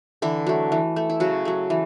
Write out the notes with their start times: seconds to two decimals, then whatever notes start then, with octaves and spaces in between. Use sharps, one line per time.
0.22 D3 E3 E4
0.47 F#3 A3
0.72 E3
0.96 A3
1.10 E4
1.20 C#3 F#3 F#4
1.45 F#3 A3
1.70 E3